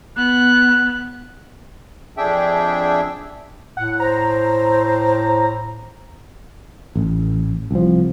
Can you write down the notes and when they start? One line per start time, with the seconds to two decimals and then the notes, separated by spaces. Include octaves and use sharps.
0.16 B3 F#6
2.17 F2 D4 G#4 E5 G5
3.77 A2 F#5
4.00 C5 A#5
6.95 A1
7.71 C2 F3